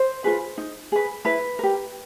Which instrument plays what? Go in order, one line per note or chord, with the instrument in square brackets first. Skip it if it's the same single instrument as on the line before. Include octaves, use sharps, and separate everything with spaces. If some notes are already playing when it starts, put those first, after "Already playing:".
Already playing: [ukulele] C5
F4 G#4 B4
D#4
G#4 B4
E4 B4
G4 A#4